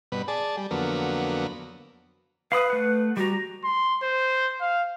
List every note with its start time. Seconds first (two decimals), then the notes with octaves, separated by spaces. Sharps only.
0.12 G2 B2 B4
0.28 G#4 D5 A5
0.57 G3
0.71 F2 D3 F#3 A#3 B3
2.52 B4 F5 B5 D#6
2.70 A3 F#5
3.17 G3 F#4 A#5
3.64 C6
4.03 C5
4.61 F5